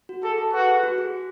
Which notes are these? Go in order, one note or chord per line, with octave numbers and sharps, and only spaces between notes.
F#4
G#4 A4
A4
F#4 B4
F#4
G#4